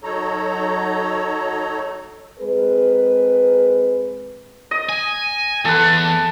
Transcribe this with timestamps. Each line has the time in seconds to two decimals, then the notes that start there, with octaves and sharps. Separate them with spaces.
0.03 F#3 D#4 A4 C#5 A#5
2.40 G#3 C4 G#4 A#4 B4
4.71 D#5
4.89 G#5
5.65 E2 A4 B4